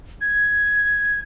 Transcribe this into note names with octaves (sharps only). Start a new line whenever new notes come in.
G#6